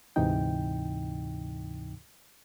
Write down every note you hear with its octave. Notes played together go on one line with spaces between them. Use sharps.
D2 G#2 C3 E3 D#4 G5